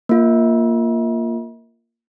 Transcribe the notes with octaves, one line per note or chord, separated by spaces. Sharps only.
A#3 F4